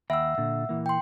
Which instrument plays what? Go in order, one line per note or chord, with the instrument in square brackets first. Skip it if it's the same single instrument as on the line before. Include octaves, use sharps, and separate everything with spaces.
[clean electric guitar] D#2 G5 B5 [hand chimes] E5 F#5 E6
[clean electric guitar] A#2 D3
A#2 E3 A#3
[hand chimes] G5 C6